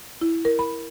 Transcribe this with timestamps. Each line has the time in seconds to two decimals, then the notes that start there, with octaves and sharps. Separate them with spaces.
0.21 E4
0.45 A#4
0.59 B5